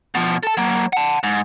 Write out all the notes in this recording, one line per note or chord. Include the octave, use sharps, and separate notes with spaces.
B2 F3
A4 A5
F#3 A#3
F#5 A5
G#2